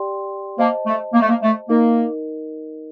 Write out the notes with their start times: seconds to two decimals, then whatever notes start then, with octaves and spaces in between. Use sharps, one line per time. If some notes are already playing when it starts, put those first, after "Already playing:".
Already playing: G4 D5 G5 C6
0.58 A#3 C5 D#5 A5
0.86 A3
1.14 A#3
1.21 A3
1.29 A#3
1.42 A3
1.69 A#3 D#4 A#4 D#5